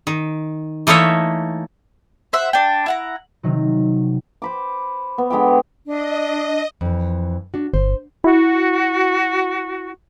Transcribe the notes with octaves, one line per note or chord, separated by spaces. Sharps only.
D#3
E3 A3 A#3 D#4 C#5 E5
C5 E5 F#5
D4 G5
E4 F#5 A#5
C3 D#3 F#3
C5 B5 D6
B3
D3 G#3 G4 G5
D4 D#5
F2 E3
D4 F#4
G1 C5
E4 F#4